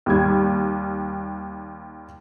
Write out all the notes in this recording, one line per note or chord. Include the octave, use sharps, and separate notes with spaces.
D#2 G3 G#6